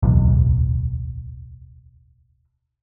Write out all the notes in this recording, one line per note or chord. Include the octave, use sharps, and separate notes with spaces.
D1 B1 E2